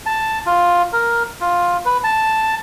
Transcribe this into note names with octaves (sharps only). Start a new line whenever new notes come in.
A5
F4
A#4
F4
B4
A5